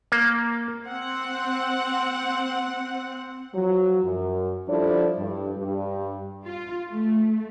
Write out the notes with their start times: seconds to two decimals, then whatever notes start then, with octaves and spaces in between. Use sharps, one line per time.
0.12 A#3
0.88 C4 F#5
3.54 F3 F#3
4.04 F#2
4.68 F3 G3 D4 E4 A4 D5
5.17 G2
5.57 G2
6.45 F4
6.89 A3